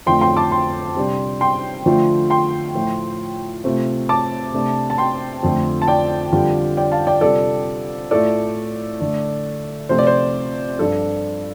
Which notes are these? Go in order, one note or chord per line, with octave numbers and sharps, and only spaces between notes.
F2 D3 A3 F4 G5 C6
G5 C6
A5 D6
G5 C6
C3 G3 D4
G5 C6
D3 F3 A3 F4
G5 C6
A2 F3 A3 F4
C3 A3 C4 F4
A5 D6
C3 A3 D4
A5
G5 C6
F2 D3 F3 A3
A5
D5 G5
F2 D3 G3 D4 F4
D5 G5
F5 A5
D5 G5
C3 G3 D4 F4 A4 D5
A2 A3 F4 A4 D5
D3 A3 D4
C3 F3 A3 C4 F4 C5
D5
C5
G2 F3 D4 F4 A4